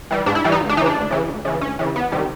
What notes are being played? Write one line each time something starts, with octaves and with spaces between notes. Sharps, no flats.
E3 G3
G#2 D4
E4
E3 G3
D#4
D2
D4
C#3 E3 D#4
D4
D2
C#3 E3
D2
C#3 E3
D2 C#4
C#3 E3
E2 B3
C3 D#3 G3